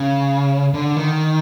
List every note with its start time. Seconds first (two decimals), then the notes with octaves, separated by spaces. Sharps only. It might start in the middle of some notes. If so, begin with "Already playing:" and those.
Already playing: C#3
0.74 D3
0.97 D#3